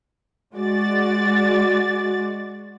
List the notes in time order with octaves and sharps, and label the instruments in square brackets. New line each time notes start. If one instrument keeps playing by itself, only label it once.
[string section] G#3 F#4 D5 A6